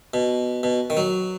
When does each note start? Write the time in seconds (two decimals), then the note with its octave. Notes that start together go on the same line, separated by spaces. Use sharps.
0.14 B2
0.63 B2
0.90 D#3
0.97 F#3